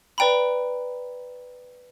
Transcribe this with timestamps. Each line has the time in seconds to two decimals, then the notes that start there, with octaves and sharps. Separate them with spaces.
0.18 B4 D5 G5 A#5 B5